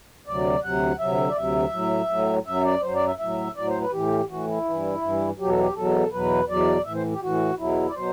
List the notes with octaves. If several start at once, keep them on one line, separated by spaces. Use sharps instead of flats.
D2 C3 F#3 D5
D2 C3 F#3 F#5
D2 C3 F#3 E5
D5
D2 C3 F#3 E5
A2 F#3
A2 F#3
F#2 F#3 E5
D5
F#2 F#3 C5
D5
E5
A2 F#3 E5
A2 F#3 D5
C5
B4
A2 E3 G4
A2 E3 F#4
E4
E3
G2
G2 E3
E2 B2 F#3 G4
A4
G4
E2 B2 F#3 A4
E2 B2 F#3 B4
E2 B2 F#3 D5
A2 E3 E5
C5
G4
A2 E3 F#4
E2 B2 F#3 E4
D5
B2 F#3 C5